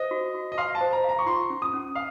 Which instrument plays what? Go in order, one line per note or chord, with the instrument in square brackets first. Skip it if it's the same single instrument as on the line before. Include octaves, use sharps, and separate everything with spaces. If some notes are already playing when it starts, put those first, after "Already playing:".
Already playing: [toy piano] C5 [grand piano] D#5
[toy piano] F#4
F#4
[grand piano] D#5
[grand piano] F5 [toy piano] C6
[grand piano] A5
[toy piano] C5
[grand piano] A#5
[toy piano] F5 [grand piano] A#5
[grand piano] C#6
[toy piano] F4 [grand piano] C6
[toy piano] C#4
[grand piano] D#6
[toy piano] C#4
[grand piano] F5